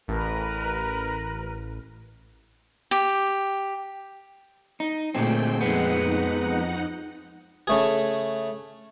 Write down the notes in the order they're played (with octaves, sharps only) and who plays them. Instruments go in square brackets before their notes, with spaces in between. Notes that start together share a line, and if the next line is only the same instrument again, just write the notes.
[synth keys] A1 [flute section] A#4 B4
[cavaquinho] G4
[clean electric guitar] D#4
[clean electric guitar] D2 G#3 C4 [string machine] A#2 A3 G5
[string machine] F2 D#4 F#5 [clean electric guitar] G#3 B3
[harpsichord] C#3 A3 G#4